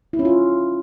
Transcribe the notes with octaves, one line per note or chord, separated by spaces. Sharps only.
E4
C#4
F4